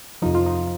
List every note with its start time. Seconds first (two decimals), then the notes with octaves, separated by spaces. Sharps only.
0.22 F2 C3 F3 D#4
0.35 F4
0.46 D#4